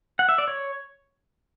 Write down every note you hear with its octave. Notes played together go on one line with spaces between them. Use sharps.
F#5
E5
D5
C#5